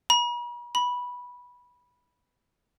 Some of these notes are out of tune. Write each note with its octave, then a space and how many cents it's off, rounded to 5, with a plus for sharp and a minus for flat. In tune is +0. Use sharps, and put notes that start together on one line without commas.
B5 -45
B5 -10